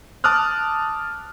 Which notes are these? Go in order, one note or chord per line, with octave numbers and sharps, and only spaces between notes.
A5 D6 D#6 F6 F#6